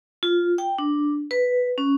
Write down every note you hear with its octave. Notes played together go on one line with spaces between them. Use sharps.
F4
G5
D4
B4
C#4